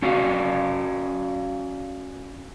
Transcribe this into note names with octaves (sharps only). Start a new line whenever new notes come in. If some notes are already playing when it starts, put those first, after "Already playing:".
C#4 F#4 D5 F5